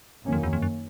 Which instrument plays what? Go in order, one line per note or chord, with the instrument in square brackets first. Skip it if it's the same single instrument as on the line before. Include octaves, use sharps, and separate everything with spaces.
[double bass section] F#2 D#3 F#3 A#3 C#4
[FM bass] F2
E2
F2
F#2